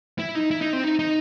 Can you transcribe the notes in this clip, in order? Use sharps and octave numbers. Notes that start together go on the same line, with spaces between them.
E4
D#4
E4
D#4
C4
D#4
D#4